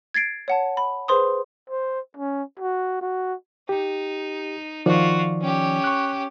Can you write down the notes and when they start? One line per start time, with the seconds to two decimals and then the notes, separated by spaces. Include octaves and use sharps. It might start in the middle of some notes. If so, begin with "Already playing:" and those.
0.14 G#6 A6 C7 D7
0.48 C#5 F#5 A5
0.77 B5
1.08 G#4 B4 C5 C6 D#6
1.70 C5
2.17 C#4
2.59 F#4
3.01 F#4
3.69 D#4 G4
4.86 D#3 F3 F4 F#4 D5
5.41 C#4 G4
5.84 C#6 F#6